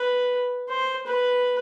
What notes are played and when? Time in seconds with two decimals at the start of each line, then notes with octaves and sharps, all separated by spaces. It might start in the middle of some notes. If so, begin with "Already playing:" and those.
Already playing: B4
0.69 C5
1.06 B4